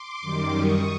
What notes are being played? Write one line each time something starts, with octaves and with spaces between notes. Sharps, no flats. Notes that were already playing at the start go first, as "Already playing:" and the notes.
Already playing: C6 D6
F#2 D#3 G3
C#6 D#6